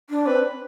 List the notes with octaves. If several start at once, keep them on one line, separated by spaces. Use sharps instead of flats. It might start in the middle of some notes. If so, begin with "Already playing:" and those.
D4
C4 B4